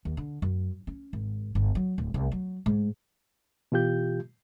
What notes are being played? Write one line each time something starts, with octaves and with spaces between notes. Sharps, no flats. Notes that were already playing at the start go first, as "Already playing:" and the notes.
D#2
D3
F#2
C#4
G#1
G1
F#3
D1
C2
F#3
G#2
B2 E3 F4 G4 G6